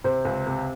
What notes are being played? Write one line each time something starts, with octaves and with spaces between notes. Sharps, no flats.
C3 C5
C#2
C3